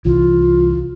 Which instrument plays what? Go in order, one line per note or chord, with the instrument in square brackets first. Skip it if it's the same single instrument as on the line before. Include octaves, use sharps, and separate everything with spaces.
[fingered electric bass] C2 E3 [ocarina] F4